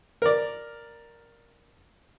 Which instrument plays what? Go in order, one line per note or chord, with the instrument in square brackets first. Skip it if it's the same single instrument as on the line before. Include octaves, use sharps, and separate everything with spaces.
[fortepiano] A#4 D5